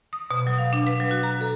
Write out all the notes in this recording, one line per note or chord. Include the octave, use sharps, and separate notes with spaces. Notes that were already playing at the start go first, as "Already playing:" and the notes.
D#6
B2
F#3
F5
D4
B4
F#3
F#4
A#5
A4